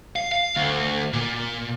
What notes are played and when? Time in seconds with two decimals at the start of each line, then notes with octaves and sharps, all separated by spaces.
0.16 F5
0.32 F5
0.56 D2
1.13 A#2